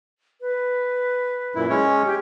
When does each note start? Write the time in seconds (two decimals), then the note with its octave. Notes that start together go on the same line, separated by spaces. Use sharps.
0.41 B4
1.55 F#2 A#2 E4
1.70 G#3 C#4 C#5
2.05 G4